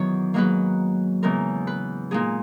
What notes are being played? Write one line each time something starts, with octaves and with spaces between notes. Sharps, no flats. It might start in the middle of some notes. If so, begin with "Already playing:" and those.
Already playing: E2 D#3 F#3 C#5
G#2 F#3 A#3 D#4 B4
E2 C#3 G#3 A#4
B4
A#2 G#3 D#4 G#4